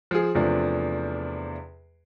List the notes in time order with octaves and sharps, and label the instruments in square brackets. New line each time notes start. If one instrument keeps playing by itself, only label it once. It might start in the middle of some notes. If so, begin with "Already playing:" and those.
[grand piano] F3 G#4
E2 C3 F3 A3 D4